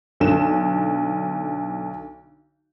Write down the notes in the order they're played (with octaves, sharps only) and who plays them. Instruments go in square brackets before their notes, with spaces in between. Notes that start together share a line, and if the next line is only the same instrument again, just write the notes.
[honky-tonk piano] B1 D3 E7